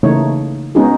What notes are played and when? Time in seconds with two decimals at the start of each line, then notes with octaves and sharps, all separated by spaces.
0.03 C#3 E3 A3 A#3 D#4 C#5
0.75 G#3 B3 C#4 D#4 F#4 G#4